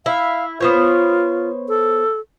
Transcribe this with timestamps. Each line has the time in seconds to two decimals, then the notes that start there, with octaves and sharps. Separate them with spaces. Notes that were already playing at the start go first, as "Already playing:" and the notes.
0.06 E4 F5
0.60 B3 F4 C5 C#5
1.69 A4